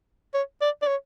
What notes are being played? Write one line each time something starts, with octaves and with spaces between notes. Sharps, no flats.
C#5
D5
D5
C#5